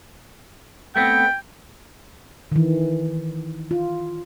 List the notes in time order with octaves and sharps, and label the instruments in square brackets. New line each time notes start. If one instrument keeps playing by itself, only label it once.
[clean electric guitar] A3 B3 C4 [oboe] G5
[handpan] D#3 E3
F4